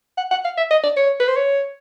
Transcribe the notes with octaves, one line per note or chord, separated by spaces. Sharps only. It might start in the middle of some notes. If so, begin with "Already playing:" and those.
F#5
F#5
F5
E5
D#5
D5
C#5
B4
C5
C#5